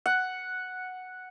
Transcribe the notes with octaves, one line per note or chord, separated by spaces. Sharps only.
F#5